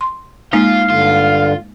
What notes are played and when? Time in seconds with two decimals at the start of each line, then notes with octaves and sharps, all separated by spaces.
0.01 C6
0.53 G#3 A#3 D#4 F4 F5
0.90 G2 D3 F4